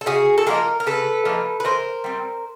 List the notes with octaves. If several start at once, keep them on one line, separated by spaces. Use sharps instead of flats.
A4
C#3 F#4 G#4
A4
F3 A#3 D#4 G#4 A#4
A#4
C#3 A4 B4
F3 A#3 D#4
B4
E3 A#4 C5
G3 C4